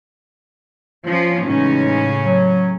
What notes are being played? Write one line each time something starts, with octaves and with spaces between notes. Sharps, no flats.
F3 C#4
A2 C#3 E3 G#3 C#4 D#4
F#3